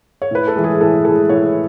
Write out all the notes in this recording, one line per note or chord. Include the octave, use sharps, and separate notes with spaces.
C#5
A2 B4
A4
E3 G#3
G#4
A2 A4
E3 G#3 A4
A2 C#5